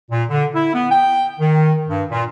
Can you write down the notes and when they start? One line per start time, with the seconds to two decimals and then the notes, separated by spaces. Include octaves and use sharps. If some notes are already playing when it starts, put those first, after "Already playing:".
0.11 A#2
0.30 D3
0.55 E4
0.75 B3
0.92 G5
1.40 D#3
1.88 G2
2.11 A#2